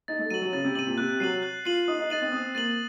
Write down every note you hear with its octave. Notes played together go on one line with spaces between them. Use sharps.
D#4 A6
A3
F#3 D#7 F#7
F#3
C#3 A6
C3
C3 D#7 F#7
A#2
C3 F#6
F#3 C7 D#7 F#7
F#6
F4 C7 D#7 F#7
D#4 D#6
D#4
D#4 A6 D#7 F#7
C4
C4 D#6
A#3 A6 D#7 F#7